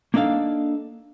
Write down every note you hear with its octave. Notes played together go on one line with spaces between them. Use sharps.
A#3 D4 D#4 A4 F5